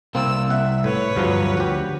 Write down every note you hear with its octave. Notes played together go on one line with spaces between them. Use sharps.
C2 A#3 C4 E6
E5 F#5
A2 B4 C#5
D2 G2 F3 F#3
F#4 G4